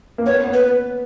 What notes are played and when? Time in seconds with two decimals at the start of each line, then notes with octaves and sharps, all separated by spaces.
0.18 A#3
0.26 B3 C#5
0.44 B3
0.53 B4